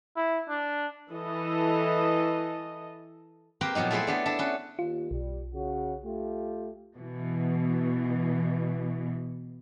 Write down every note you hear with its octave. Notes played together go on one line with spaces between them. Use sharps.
E4
D4
E3 A4 D#5
A#3 C4 G4 A#4 B4 G5
A#2 F3 F#3 B3 D#4
A3 E4 G#4 B4 C5 G5
A3 B3 D4
D4 A4 E5
C#4 B4
D#2 F4
B1 G3
C#3 F#4
A3 F4 G4
B2 E3